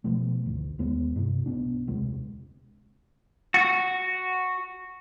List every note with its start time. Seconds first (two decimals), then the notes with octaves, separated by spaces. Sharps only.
0.04 B2 F3 A3
0.46 G#1 D2
0.79 D#2 G#3 B3
1.16 G2 C3
1.46 B1 B3 D4
1.87 E1 C#2 C3 G#3
3.54 F#4